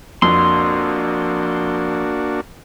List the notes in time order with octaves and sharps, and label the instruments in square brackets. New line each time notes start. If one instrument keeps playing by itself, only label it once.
[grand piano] F2 [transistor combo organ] A#3 D4 F#4 [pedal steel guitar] C6